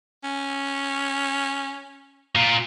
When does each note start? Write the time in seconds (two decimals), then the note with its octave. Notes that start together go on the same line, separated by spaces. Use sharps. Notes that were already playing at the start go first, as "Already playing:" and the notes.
0.23 C#4
2.36 A#2